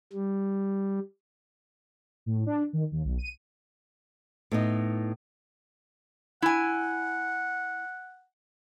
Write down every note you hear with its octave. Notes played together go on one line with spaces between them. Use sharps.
G3
A2
D4
D#3
D#2
B1
D#7
A2 B3 D#4
E4 F#5 G#5